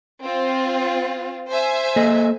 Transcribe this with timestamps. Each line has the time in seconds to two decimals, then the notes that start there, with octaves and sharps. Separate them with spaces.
0.24 C4 F4
1.50 C5 E5 G#5
1.96 A#3 A4 D#5